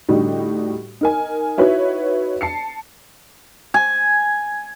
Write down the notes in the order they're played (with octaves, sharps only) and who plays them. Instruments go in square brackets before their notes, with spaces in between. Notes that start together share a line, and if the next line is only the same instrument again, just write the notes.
[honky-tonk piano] A2 D3 G3 D#4 F#4 G4
D#4 A#4 G#5
D#4 E4 F#4 B4 C#5 E5
A5 C7 C#7
[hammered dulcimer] G#5